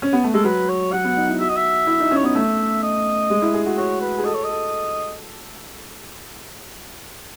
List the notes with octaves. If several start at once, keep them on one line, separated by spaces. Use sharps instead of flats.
C#4
B3
A3
G#3 A4
F#3 B4
C#5
F#3 F#5
B3
D#4
E4
F#4 E5
D#5
E5
E4
D#4
C#4
C#5
B3 D#5
A3 E5
D#5
G#3
E4
G#4
F#4
F#4 C#5
B4
G#4
A4 D#5
C#5
A4 D#5